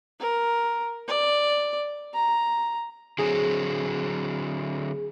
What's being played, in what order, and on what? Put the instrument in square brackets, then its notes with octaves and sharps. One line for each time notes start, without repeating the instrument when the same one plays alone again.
[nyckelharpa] A#4
D5
A#5
[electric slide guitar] D3 F#3 C4 [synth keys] G#4